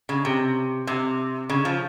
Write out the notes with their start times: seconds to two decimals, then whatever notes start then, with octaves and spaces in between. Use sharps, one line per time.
0.09 C#3
0.25 C3
0.87 C3
1.50 C#3
1.65 F3